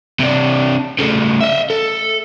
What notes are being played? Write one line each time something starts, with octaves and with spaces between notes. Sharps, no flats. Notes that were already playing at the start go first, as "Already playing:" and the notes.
C3 D4
C#3 A3
D#5 E5
A4